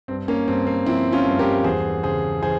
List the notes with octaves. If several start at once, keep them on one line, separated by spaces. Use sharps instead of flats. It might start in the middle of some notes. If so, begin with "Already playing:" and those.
G2 C4
A#3 C#4
G2 C4
A#3
F3 C4 E4
C#4 F4
G2
G4 A#4
E2 G#4 C5
C#3 G#4 C5
E3 G#4 C5